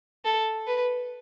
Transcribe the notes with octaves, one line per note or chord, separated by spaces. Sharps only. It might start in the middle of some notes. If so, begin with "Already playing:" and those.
A4
B4